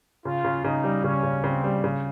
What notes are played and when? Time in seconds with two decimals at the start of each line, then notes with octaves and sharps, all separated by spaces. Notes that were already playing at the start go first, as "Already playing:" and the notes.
0.24 C#3 F4
0.44 C#3
0.64 C#3 D#4
0.84 G3
1.04 C#3 C#4
1.23 C#3
1.44 C#3 C4
1.64 G3
1.84 C#3